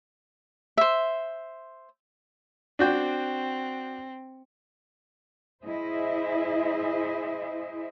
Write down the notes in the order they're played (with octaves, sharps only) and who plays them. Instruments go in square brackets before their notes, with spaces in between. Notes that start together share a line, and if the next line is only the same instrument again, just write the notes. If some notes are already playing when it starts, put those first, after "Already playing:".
[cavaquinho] C5 E5
[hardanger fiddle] C4 [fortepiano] D4 F#4 G5
[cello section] E4 G#4 C5 D#5 E5